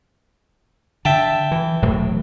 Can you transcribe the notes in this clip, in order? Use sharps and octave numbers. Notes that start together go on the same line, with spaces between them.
D3 E5 G5 A5
E3
E1 A2 F#3